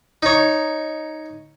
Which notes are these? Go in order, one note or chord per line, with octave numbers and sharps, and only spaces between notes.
D#4 C#5